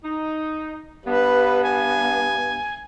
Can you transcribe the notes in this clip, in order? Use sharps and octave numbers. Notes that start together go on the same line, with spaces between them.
D#4
G2 B3 B4
G#5